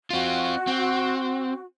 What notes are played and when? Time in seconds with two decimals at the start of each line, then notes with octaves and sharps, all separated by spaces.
0.10 C4 F4 F#4
0.67 C4